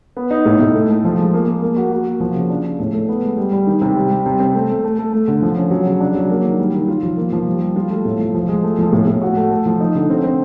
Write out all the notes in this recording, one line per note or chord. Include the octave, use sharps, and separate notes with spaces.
B3
D#4
A2
A2
A3
A3
F3
G#3
A#3
A#3
A#3
F#4
F#4
A#3
F3
C#3
D4
D4
A2
A3
B3
G#3
G3
G3
D#3
C3
G3
G3
C3
C4
A3
A3
A3
A3
A3
D3
F3
C#4
F#3
C#3
D4
F#3
A#3
D#3
G3
D#3
F4
F3
A#3
F3
G3
G3
F4
A3
A2
F3
F3
G#3
A3
F3
A2
A2
F#4
A3
A3
F3
D#4
D3
C4
C4